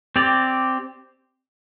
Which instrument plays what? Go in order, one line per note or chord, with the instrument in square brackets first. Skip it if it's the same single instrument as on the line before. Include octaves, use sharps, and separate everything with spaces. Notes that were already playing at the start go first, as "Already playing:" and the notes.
[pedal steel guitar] C4 G4 D5